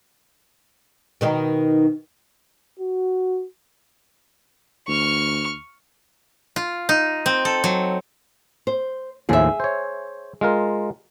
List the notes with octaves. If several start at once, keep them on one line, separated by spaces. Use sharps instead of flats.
B2 D#3 D#4
F#4
D2 C#6 F6
F4
D#4
C4
A4
F#3
C5
D#2 A2 F3 G#4 E5
C5 C#5
G#3 F4 A#4